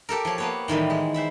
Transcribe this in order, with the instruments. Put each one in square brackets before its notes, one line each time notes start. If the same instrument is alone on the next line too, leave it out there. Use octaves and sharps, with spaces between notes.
[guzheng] G4 A4 A#4
F3 C#5
A#3 B3 C#5
A2 D#3 E3 G3
G#3
C5 E5 B5